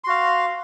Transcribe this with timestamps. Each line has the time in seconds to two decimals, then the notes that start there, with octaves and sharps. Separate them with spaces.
0.04 C6
0.07 F#4
0.10 F5